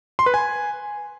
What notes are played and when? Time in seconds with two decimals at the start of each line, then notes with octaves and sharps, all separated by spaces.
0.19 C6
0.26 B4
0.34 G#5